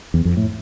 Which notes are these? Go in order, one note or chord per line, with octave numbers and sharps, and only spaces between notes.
E2
F2
A2